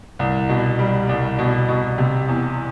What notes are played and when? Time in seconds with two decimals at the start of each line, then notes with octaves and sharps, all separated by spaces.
0.19 C2
0.49 B2
0.79 G3
1.09 C2
1.39 B2
1.68 B2
1.98 C3
2.28 E2